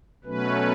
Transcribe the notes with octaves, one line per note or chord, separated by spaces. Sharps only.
B2 F#3 A3 C#4 B4